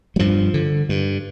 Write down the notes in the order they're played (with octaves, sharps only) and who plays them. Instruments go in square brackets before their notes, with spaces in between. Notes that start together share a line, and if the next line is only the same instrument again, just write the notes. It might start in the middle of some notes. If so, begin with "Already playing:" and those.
[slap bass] G3
G2 F3
D3
G2